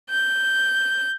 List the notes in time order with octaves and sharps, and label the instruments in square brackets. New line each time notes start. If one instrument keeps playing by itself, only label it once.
[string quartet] G6